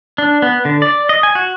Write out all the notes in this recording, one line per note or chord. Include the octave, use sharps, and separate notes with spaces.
D4
B3
D3
D5
D#5
G#5
F#4